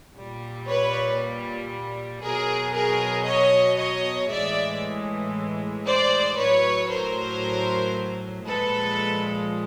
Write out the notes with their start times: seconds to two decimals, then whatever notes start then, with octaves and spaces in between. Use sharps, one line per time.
0.15 A#2 G3
0.66 B4 C#5
2.22 B2 F#3 G#4 A#4
2.74 G#4 A#4
3.27 C#5 D#5
3.78 C#5 D#5
4.31 A2 E3 G#3 D5 E5
5.86 C5 D5
6.38 A2 F#3 B4 C#5
6.90 A#4 C5
8.45 A#2 F3 G#3 A4 B4